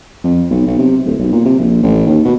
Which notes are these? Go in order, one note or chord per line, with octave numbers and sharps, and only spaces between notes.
F2
B1
B1
C3
D1
B1
A#2
C3
A#1
A1
D#2
B2